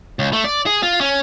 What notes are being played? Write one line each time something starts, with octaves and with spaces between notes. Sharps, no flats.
C#2
A3
D5
G#4
F4
C#4